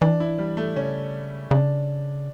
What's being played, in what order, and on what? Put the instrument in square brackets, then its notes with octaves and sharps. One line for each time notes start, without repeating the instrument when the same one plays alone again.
[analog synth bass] E3 [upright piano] D4
[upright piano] E4
G3
A3
[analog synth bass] C#3 [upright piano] C#4
[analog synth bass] C#3 [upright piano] D4